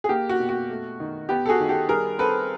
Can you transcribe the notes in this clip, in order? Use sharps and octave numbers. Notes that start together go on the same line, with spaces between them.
G#4
A#3 G4
F#4
B2
F#4
A3
D#3
B3 G4
A4
F#4 G#4
D#3
G4 A4
G3 G#4 A#4
C4 A4 B4